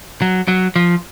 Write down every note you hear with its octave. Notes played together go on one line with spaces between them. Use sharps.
F#3
F#3
F3